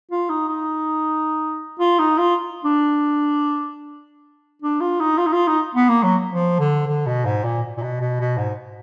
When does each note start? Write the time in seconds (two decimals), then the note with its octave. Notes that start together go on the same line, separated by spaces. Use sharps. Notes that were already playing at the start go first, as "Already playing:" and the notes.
0.11 F4
0.29 D#4
0.49 D#4
1.80 F4
1.99 D#4
2.18 F4
2.65 D4
4.62 D4
4.81 F4
5.00 D#4
5.18 F4
5.27 D#4
5.33 F4
5.47 D#4
5.75 B3
5.89 A#3
6.03 F#3
6.32 F3
6.59 D3
6.87 D3
7.06 B2
7.25 G#2
7.44 A#2
7.78 A#2
7.82 B2
8.01 B2
8.20 B2
8.38 G#2